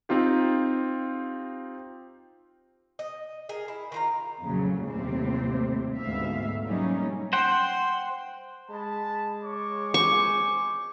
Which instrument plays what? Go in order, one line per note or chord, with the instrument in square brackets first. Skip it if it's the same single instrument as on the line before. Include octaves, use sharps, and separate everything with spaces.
[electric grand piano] C4 D#4 F4 G4
[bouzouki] D#5
G#4 A#4
E4
D#3 F4 A#5
[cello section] F2 A#2 C#3 F#3
D#2 A2 C3 G3 C4
D2 G#2 B2 E5 F5
F#3 G3 A3 A#3 C#4 D#4
[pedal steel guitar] C5 F#5 G5 [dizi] C6
[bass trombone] G#3 [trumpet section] A5 B5
[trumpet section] C#5 C#6 D6
[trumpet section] C5 G#5 [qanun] C#6 [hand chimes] D6